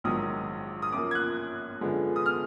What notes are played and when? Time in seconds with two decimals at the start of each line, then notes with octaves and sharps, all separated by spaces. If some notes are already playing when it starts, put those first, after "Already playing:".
0.04 A#1 G#2 D#3 F#3 D#6
0.82 D#6
0.92 F#2 F3 A#3 D6
1.11 G#6
1.15 F#6
1.81 F#2 D3 F3 G#3 B3
2.16 D#6
2.26 F6